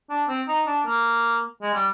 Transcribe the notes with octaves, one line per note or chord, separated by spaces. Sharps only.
D4
C4
D#4
D4
A#3
G#3
G3